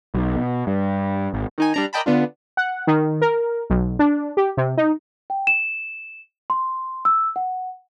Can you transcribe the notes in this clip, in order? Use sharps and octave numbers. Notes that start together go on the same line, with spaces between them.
B1
B2
G2
G#1
D#3 D#4 G#5
G3 D4 A#5
A#4 D5 D#5 G5 A5 B5
D3 B3 D4 F4
F#5
D#3
A#4
B1
D4
G4
C3
D#4
G5
E7
C6
E6
F#5